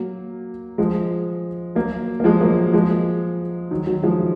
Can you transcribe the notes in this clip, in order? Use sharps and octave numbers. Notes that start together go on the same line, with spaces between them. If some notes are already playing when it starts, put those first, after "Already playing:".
Already playing: F#3 A#3
F3 G#3
F#3 A#3
A#3
F3 G#3
F#3 A#3
F3 G#3
D#3 F#3
D#3 F#3
F3 G#3